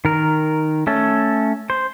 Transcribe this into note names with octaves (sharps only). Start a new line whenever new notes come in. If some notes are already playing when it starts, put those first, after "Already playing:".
D#3 A#4
A3 C#4 A4
C5